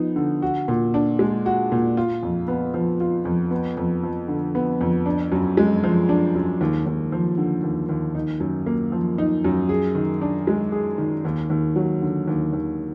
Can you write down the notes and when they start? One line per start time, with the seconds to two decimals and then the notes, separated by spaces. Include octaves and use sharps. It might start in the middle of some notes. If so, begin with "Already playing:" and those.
Already playing: F3 B3 D#4
0.16 D3
0.42 F#4
0.68 A#2
0.94 D4
1.19 G#3
1.46 F#4
1.72 A#2
1.97 F4
2.23 F2
2.48 B3
2.74 F3
3.00 F4
3.25 F2
3.51 B3
3.77 F2
4.03 F3
4.28 D3
4.55 B3
4.81 F2
5.06 D4
5.32 F#2
5.57 G#3
5.84 F3
6.09 D4
6.35 F#2
6.61 D#2
6.86 D#2
7.12 F3
7.37 D3
7.63 D#2
7.89 D#2
8.15 D#4
8.40 F#2
8.66 A#3
8.92 F3
9.18 D#4
9.44 F#2
9.69 G#4
9.95 D#3
10.21 D4
10.47 G#3
10.72 G#4
10.98 D#3
11.25 D#2
11.50 D#2
11.76 F#3
12.02 D3
12.28 D#2
12.53 D#2